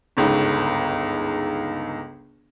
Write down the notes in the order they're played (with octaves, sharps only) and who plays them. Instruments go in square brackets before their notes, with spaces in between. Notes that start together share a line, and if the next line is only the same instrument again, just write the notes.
[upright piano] G1 C#2 G#2